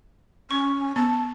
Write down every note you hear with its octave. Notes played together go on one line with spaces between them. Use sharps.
C#4 C#6
B3 A5